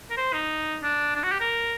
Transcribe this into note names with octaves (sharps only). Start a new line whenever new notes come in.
A#4
C5
D#4
D4
D4
F#4
G4
A#4